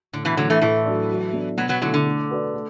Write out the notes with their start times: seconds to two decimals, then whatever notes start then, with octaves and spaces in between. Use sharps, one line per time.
0.13 A2 D3
0.25 B2 E3
0.37 D3 E3 F#3 A3
0.50 E3 A3
0.61 A2 E3 A3
0.85 F#3 D4 A4 D5
1.10 F#3
1.33 B3 D4
1.58 B2 F#3 B3
1.69 F#3 B3
1.81 D3 F#3 A3 E4
1.94 D3
2.06 A3
2.30 F#4 B4 D5
2.54 A3